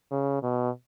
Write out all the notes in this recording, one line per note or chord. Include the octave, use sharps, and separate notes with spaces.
C#3
B2